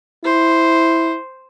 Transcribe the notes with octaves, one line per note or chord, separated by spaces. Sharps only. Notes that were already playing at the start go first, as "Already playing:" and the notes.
E4 C5